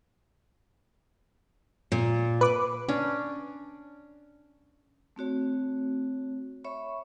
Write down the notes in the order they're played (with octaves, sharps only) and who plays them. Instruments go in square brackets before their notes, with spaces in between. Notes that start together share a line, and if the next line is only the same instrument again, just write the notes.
[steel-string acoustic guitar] A#2
[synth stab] B4 D6
[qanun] C#4 D4
[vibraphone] A3 C4 F#4 C#5
C#5 E5 B5 C#6